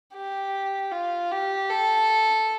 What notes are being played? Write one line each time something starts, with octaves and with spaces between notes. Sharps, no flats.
G4
F4
G4
A4